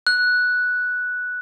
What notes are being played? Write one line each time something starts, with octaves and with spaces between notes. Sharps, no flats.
F#6